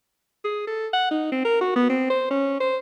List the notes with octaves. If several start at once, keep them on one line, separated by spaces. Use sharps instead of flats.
G#4
A4
F#5
D#4
C4
A#4
F#4
B3
C4
C5
C#4
C5